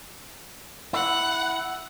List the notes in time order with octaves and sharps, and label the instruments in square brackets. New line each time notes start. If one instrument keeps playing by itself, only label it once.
[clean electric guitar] E4 [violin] F#5